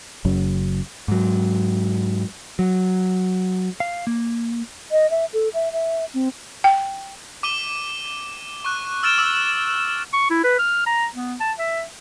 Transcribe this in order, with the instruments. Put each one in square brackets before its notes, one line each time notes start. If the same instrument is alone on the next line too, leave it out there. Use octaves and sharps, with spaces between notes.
[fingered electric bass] F#1 F#2 C#3 F#3
[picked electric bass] G#2 F#3
F#3
[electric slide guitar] F5
A#3
[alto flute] D#5
E5
A4
E5
E5
C4
[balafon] G5
[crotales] D6 D#7 G7
C#6 F#6
E6 F6 A6 D7 E7
D6 E6
[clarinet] C#6
E4
B4
F6
A#5
B3
A5
E5